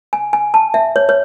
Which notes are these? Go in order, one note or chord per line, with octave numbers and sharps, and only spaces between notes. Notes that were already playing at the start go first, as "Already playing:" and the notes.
G#5
G#5
A5
E5
C#5
C#5